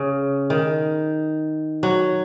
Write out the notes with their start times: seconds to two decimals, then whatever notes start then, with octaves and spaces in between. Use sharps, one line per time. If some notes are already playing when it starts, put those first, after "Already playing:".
Already playing: C#3
0.50 D#3
1.83 F#3